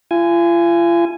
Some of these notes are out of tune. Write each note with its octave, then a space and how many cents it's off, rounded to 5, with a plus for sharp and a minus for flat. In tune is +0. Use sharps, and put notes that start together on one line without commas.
F4 -40 G#5 +0